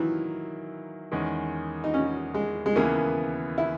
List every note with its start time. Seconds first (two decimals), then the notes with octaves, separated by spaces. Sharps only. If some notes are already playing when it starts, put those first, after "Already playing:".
Already playing: D#3 E3 F#3 A#3 E4
1.12 E2 D#3 G#3 C#4
1.84 D#4
1.94 C#4
2.34 G#3
2.66 G#3
2.76 D#2 C#3 E3 A#3 B3
3.58 E4